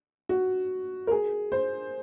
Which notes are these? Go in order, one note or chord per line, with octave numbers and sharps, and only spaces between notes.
F#4
A#4
G#4
C5